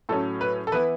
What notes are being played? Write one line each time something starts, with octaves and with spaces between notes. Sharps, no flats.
A2 F#3 A3 C#4 A4
B4
A4
E3 B3 E4 B4